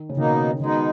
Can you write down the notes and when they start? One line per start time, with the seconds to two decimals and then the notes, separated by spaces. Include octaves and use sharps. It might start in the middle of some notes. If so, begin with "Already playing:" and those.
Already playing: D#3
0.09 C#3
0.17 B2 D#3 A#3 D#4
0.59 B2 D#3 G#3 D#4